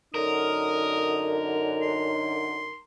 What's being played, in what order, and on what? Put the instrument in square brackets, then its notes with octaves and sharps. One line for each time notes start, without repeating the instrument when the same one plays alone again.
[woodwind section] F#2 D3 [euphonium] D#4 [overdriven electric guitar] A#4 [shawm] D#6
[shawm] C6